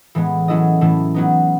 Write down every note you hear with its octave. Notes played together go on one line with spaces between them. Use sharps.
A2 E3 G#3 B3
F#3 C#4 E4 A4 D#5
A2 E3 A3 E4
F#3 B3 D#4